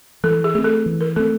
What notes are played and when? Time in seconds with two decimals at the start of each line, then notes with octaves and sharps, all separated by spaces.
0.23 E3 A4
0.44 G#4
0.55 A3 C4 G#4
0.64 A4
0.86 E3
1.00 A#4
1.16 A3 C4 A4